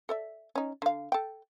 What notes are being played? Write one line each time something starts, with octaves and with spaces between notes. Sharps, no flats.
A4 D5 E5
C#4 D#4
D3 F5
A4 G5